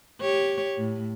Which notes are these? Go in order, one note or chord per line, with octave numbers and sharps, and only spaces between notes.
G4 C#5
A2